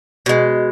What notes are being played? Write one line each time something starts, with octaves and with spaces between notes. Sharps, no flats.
B2 G#3